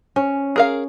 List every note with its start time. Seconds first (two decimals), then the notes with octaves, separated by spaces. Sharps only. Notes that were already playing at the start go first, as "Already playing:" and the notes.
0.16 C#4
0.56 G#4 A#4 F5